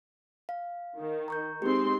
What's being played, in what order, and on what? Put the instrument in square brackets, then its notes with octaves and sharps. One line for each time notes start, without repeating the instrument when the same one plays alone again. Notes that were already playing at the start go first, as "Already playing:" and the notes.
[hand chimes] F5
[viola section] D#3
[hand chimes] A#5 C#6 G6
[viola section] G#3 C4 C6 [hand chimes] D#4 G4